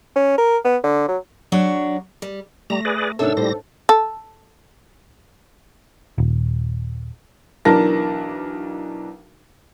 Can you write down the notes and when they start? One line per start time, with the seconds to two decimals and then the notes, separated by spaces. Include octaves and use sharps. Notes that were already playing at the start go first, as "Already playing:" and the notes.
0.16 C#4
0.38 A#4
0.65 B3
0.84 D3
1.08 F#3
1.52 F#3 D4 C#5
2.22 G3
2.70 G3 A3 A#5 A#6
2.85 G#4 B4 D5
3.19 G#2 C3 D4 A4 A#4 C#5 E6
3.37 A2 G3 C5 A#6
3.89 A4
6.18 D#1
7.65 B1 E3 D4 A#4 A5 A#6